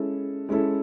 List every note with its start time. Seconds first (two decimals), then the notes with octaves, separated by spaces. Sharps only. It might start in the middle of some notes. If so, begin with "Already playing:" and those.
Already playing: G#3 C#4 E4 A4
0.49 G#3 C#4 E4 A4